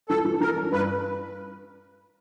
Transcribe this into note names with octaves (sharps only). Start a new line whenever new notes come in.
E3 A4
E3
E3 A#4
C#4
G2 B4